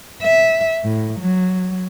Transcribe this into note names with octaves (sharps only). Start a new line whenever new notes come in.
E5
A2
F#3